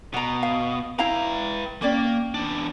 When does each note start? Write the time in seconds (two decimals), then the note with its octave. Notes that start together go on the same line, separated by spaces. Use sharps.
0.14 B2 F#5 A#5
0.43 F5
0.99 E4 B4 F5 G5 A#5
1.82 A#3 C#4 D5 G5
2.34 E2 D4